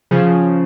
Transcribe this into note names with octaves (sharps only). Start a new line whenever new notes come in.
C#3 F3